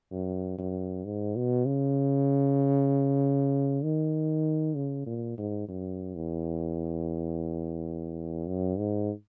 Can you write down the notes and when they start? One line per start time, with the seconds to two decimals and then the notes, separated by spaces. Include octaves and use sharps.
0.11 F#2
0.58 F#2
1.05 G#2
1.36 B2
1.66 C#3
3.84 D#3
4.76 C#3
5.06 A#2
5.38 G#2
5.69 F#2
6.16 E2
8.47 F#2
8.79 G#2